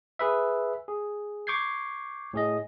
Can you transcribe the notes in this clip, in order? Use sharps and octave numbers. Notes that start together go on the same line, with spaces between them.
G#4 B4 E5
G#4
C#6 D6 G6 G#6 C7
A2 G#4 D#5